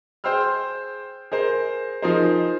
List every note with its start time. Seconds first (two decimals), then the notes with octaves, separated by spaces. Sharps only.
0.24 G#4 C5 G5 C6 E6 F6
1.32 G#4 A#4 C5
2.02 F3 D#4 F4 G#4 A#4 C5